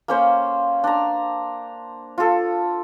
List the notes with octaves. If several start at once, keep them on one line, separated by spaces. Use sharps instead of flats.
A#3 C#4 C5
D4 A#5
F4 A4